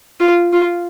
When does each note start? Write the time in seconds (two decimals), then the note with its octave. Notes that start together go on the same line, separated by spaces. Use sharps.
0.20 F4
0.53 F4